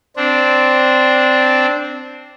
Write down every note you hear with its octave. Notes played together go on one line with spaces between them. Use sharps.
C4 D4